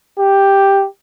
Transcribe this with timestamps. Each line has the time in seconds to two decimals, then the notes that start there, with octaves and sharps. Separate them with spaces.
0.19 G4